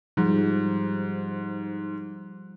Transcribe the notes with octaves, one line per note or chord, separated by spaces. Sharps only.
G#2 F3 G3